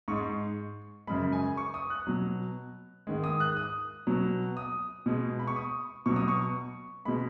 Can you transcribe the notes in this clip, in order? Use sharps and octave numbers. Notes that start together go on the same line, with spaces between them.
G#2 G#3 C#6
F#2 C#3 G#3 B5
G#5
C#6
D#6
F#6
B2 F#3
G#2 D#3 G#3
D#6
F#6
D#6
B2 F#3
D#6
B2 G#3
B5
C#6
D#6
B2 F#3 C#6
D#6
C#6
B2 G#3 B5